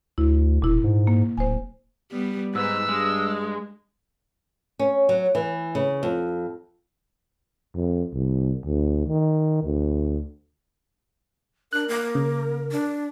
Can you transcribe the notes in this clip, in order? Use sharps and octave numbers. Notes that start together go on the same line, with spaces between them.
D2 E4
E1 A#2 E4
G#2
A#3
D1 C5 G#5
G3 B3
G#2 B4 E6
G2 G#3
C#4
F#3
E3
C#3
F2
F2
C2
D2
D#3
D2
D4 A#4 F#6
A#3
C#3
D4